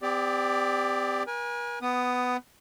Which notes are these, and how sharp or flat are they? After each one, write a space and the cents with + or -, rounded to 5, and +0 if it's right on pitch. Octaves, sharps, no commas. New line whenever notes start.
C4 -35 G4 +25 D5 +0
A#4 +45 G#5 -15
B3 +15 D#6 -15